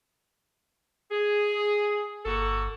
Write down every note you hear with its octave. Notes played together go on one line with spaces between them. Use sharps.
G#4
G1 A#3 F#4 A4